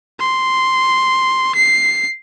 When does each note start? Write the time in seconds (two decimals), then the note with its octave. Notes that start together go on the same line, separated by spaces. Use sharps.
0.20 C6
1.55 C7